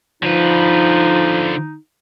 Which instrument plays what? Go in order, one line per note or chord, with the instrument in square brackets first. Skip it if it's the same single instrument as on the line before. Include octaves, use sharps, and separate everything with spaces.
[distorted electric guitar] D3 B4 [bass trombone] F3 [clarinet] D#4